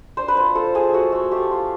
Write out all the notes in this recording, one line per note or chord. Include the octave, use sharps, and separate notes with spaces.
D4 C5
B4
F4 C5
F4 A4
F4 G#4
A3 F#4
A3
A3 G4
F4